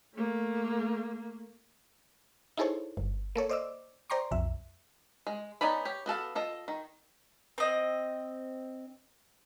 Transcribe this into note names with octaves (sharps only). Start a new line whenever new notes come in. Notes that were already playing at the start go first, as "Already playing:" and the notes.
A3 A#3
D#4 E4 G#4 A4 C5 C#5
G1
A#3 A4 C#5
C5 D5 D#5 D6 E6
C5 D5 G5 A#5 C6 C#6
B1 F2 E5
G#3
B3 C#4 D#4 D5 B5
G4 C#5
B3 F#4 A4 F5
F4 A4 D#5
D#3
C4 D#5